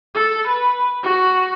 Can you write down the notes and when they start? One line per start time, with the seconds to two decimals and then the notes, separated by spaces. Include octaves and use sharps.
0.15 A4
0.48 B4
1.03 F#4